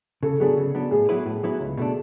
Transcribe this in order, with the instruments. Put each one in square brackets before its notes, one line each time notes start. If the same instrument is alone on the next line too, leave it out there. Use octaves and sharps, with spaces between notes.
[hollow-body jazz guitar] C#3 [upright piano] A4
[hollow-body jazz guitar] F#3 B3 D4 [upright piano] G#4
[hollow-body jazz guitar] C#3
F#3 B3 D4
[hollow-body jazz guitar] A2 [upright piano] G#4
[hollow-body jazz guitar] F#3 B3 E4 B4
A2
F#3 B3 E4 B4
C#2
B2 A3 D4